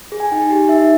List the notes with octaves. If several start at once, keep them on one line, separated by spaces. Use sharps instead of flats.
G#4
G#5
D#4 G5
G4
D#4 E5